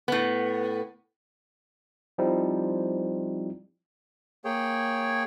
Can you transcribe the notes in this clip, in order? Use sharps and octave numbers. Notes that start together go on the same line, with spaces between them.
A2 B3
F3 G3 C4 D#4 E4
A#3 G#4 C#5 G5